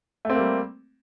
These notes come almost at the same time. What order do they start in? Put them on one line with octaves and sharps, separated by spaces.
A3 C4 A#3 G3